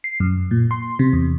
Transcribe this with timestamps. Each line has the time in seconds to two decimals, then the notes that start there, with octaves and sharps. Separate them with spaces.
0.04 C7
0.20 F#2
0.51 A#2
0.71 C6
0.99 C3
1.13 E2